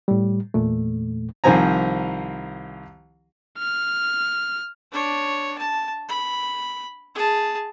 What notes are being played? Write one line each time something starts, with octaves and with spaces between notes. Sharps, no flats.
A2 G3
E2 A#2 A3
C2 D#3 F3 C4 G#5 A#5
F6
D4 C#5
A5
B5
G#4 A5